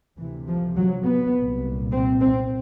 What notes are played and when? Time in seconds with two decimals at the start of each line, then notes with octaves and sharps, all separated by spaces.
0.17 D2 C3 E3
0.47 F3
0.76 F#3
1.05 B3
1.34 C2 A#2
1.93 C4
2.21 C4